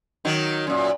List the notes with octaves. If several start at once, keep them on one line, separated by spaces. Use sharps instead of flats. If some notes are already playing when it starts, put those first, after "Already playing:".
D#3 F#3
F#2 A#2